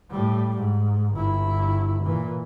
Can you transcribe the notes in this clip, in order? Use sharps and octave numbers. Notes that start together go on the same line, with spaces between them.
A2 G3
G#2
G1 E4
A#2 E3